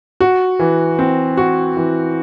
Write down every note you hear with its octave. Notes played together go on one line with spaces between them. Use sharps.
F#4
E3
C4
F#4
E3